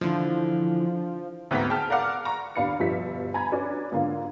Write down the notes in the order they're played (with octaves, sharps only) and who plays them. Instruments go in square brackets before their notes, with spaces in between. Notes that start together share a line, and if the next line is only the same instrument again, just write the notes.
[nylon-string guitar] D3 E3 [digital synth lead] F3
[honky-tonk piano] D2 G#2 B3 C4 F#4 B6
G#4 G5 A5 F6
A#4 D5 F5 F#5 D6 F6
A#5 C#6
D#2 D4 F5 B5 C#7
G1 B2 F3 G3 E5 B6
G#5 A#5 B5 G#6
C#4 D4 F#4 B4 D5
G#2 D3 A#3 F4